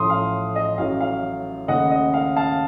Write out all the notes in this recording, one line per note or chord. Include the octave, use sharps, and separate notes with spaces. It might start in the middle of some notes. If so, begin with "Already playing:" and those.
Already playing: A1 A2 F3 C6 D#6
F5
D#5
A1 A2 F#3 F5
F5
D#2 C#3 A3 D#5 F#5
D#5
F5
F5 A5